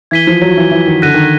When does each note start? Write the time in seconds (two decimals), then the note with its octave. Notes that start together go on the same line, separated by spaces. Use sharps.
0.11 E3 G#6 B6 D#7 G7
0.27 F3
0.42 F#3
0.57 E3
0.72 E3
0.86 D#3
1.02 D3 F#6 A#6 D#7
1.14 D#3